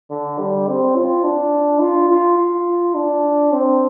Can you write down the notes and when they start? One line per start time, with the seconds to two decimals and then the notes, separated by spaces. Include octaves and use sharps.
0.10 D3
0.39 G3
0.68 C4
0.97 F4
1.24 D4
1.81 F4
2.10 F4
2.38 F4
2.94 D4
3.52 C4